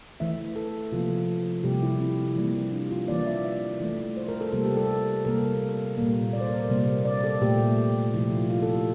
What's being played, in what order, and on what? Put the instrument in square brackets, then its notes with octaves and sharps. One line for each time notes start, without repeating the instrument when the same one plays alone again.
[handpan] E3 A3 E5
A4
C3 F3 A#3 F4
C3 G3 A#3 G4
E4
C4
E3 G3 A#3
D4
F4
E3 A#3 D5
E5
E5
E3 A3
C5
A#4
A4
C3 G3 A#3 A4
G4
A4
C3 G3 A#3 A#4
A#2 G3 A#3
D5
C5
A#4
C5
C3 G3 A#3
D5
A4
A#2 A3 G4
C3 F3 A3 E4
F4
F4
A4
G4